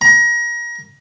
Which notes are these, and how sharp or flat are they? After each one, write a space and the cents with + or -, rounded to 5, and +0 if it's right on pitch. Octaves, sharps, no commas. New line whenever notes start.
A#5 +30